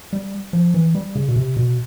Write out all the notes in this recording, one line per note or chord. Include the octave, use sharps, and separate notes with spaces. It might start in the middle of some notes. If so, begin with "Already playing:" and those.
G3
F3
E3
G3
C#3
B2
C3
B2